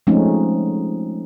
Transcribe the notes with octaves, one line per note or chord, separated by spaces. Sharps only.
F3 G#3 A3 C4 C#4 D#4